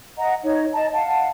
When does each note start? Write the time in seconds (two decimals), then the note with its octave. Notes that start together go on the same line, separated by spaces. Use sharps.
0.18 D#5 F#5 A#5
0.44 D#4 C#5
0.75 D#5 A5 A#5
0.94 F5 F#5 A5